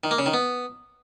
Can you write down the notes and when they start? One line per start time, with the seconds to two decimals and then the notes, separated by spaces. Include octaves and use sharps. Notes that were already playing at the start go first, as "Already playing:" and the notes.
0.04 D#3
0.11 A#3
0.19 C#3
0.26 D#3
0.34 B3